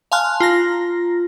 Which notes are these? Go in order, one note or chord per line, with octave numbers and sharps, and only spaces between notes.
F5 G#5 A5 C6 F6 F#6
F4 A#5 A#6